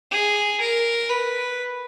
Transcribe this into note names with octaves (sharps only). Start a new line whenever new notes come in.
G#4
A#4
B4